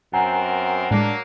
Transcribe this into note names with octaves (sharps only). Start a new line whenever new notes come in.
F#2 B3 C4 A#4 F#5 G#5 A#5
A2 F#3 G#3 A#3 D4